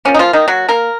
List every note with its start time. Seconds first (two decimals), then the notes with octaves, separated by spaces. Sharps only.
0.05 F3 A#3 C#4
0.14 D#4
0.19 F3 F4
0.33 D#3 D#4
0.48 F#3 F#4
0.69 A#3 A#4